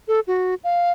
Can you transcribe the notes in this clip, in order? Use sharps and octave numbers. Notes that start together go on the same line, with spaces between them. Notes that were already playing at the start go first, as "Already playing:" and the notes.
A4
F#4
F5